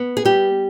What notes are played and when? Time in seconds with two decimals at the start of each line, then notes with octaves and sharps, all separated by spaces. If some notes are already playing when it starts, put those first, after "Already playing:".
Already playing: B3
0.17 G#4
0.25 G3 G4